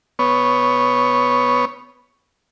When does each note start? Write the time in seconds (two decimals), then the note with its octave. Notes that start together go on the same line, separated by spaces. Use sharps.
0.19 B3 C#5